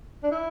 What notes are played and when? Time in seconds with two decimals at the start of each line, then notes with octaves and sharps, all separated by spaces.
0.23 D4
0.31 E4